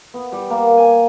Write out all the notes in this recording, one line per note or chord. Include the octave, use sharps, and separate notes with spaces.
B3
G3
A#3
G#5